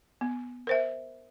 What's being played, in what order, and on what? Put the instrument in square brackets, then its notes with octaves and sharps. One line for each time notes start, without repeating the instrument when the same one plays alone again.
[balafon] B3
A#4 C5 E5